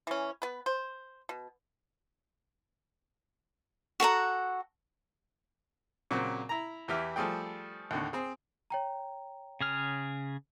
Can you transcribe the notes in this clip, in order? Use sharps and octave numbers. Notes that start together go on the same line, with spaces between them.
E3 C#4
B3 B4
C5
B2
F#4 A4 F#5 A#5
A#2 C#3 F#3 C4
E4 A#5
E2 E3 E4 G4 F6
F3 G3 A3 G#4 G5
D#2 A2 D3
C4 G#4
C#5 G5 A#5
C#3 G#4 F6